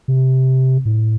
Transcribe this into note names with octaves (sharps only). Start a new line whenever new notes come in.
C3
A2